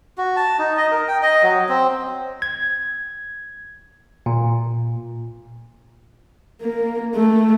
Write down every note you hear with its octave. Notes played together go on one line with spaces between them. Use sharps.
F#4
A5
D#4
D#5
A#4
G5
D#5
F#3
C4
G#6
A#2
A#3
A3